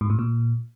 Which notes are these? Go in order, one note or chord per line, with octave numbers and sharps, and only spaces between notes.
G#2
A2
A#2